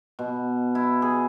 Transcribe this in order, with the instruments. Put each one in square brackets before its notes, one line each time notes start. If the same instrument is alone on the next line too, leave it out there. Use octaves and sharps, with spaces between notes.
[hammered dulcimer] B2
E4
G#4